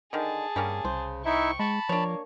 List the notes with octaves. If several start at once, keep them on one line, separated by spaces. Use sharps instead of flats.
D3 D#3 G#4 A5
G2 G3 A#3 C#4
C2 C#3 C5
D#4 E4 E5 G5 C#6
G#3 A5 B5
F3 A#3 D4 C#5